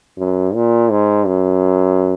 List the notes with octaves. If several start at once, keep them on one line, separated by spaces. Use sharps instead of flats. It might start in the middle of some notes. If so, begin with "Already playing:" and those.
F#2
A#2
G#2
F#2